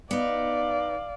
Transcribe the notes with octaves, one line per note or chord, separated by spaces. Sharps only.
B3 D#4 D5 F5